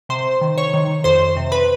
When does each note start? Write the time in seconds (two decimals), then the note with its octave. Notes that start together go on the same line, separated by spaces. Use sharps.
0.09 C3 C5 C6
0.41 D#3
0.58 C#5 C#6
0.74 D#3
1.04 F2 C5 C6
1.37 C3
1.52 B4 B5